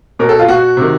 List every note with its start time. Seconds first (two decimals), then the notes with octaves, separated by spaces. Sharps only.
0.19 B2 A#4
0.29 A4
0.39 F4
0.48 B2 F#4
0.77 C3 D#3